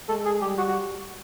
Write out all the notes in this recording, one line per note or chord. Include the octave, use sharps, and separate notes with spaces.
G#3 A4
G#4
G3 G4
F#4
F#4